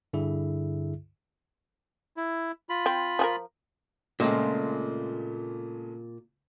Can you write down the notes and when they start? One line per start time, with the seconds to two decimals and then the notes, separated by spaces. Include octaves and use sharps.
0.13 G2 D3 E4 G#4 E5
2.17 E4
2.69 F4 B5
2.86 C4
3.19 F3 G#4 A#4
4.20 A#2 C#3 G#3 A3 C4